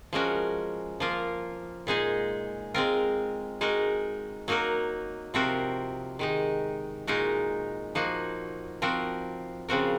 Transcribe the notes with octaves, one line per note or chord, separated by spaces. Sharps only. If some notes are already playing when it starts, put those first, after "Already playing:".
F3 G#3 C#4 F#4 A#4
F3 A#3 F4 A#4
A#2 G#3 D#4 G#4
G#3 C4 F4 A#4
G#3 D#4 F#4 A#4
F#3 A#3 D#4 F#4 A#4
C3 F3 C4 F#4 A#4
D#3 G#3 D#4
A#2 G#3 D#4 F#4 A#4
F3 A#3 D#4 F#4
F3 C4 F#4 A#4
C#3 F3 C4 F#4 A#4